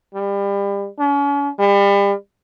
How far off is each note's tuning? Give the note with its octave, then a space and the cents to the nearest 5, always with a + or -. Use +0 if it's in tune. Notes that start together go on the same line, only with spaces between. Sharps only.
G3 +30
C#4 +40
G3 +35